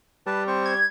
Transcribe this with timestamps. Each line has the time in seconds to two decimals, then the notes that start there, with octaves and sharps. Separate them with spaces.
0.27 G3 B4 A5
0.47 C4 C5 C#6
0.65 G#6